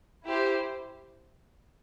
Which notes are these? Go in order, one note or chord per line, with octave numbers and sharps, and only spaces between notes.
E4 G4 C5